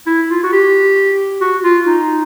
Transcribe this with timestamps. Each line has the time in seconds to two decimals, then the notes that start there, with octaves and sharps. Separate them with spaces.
0.06 E4
0.30 F4
0.43 F#4
0.52 G4
1.41 F#4
1.64 F4
1.86 D#4